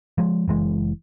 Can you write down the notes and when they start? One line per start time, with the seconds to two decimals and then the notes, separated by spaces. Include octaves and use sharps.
0.18 F3 G#3
0.48 F#1 E3 G#3